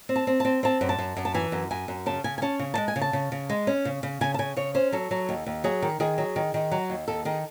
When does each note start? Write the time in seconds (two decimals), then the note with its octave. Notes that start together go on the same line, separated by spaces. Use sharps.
0.09 C4
0.16 A5
0.27 C4
0.40 C4 A5
0.63 C4 A5
0.81 F#2
0.89 A5
0.98 F#2
1.17 F#2
1.25 A5
1.34 E3 G#5
1.52 F#2
1.71 F#2 G#5
1.88 F#2
2.06 C#3 A5
2.24 C#3 G#5
2.38 G#5
2.42 C#4 A5
2.59 C#3
2.74 G#3 A5
2.88 G#5
2.96 C#3
3.01 A5
3.13 C#3
3.32 C#3
3.49 G#3
3.67 C#4
3.85 C#3
4.03 C#3
4.21 C#3 G#5
4.34 A5
4.39 C#3 G#5
4.57 C#3 C#5
4.75 C#4 C5
4.92 F#3 A4
5.11 F#3
5.29 D#2
5.46 D#2
5.64 F#3 G#4
5.82 D#3
6.00 D#3 G#4
6.18 F#3
6.36 D#3
6.54 D#3
6.71 F#3
6.90 D#2
7.08 D#2 A4
7.25 D#3 G#4